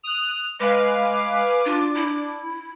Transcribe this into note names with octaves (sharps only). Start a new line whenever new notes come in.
D#6 F#6 F7
G#3 B4 F5 G#5 D6
D4 F4
E4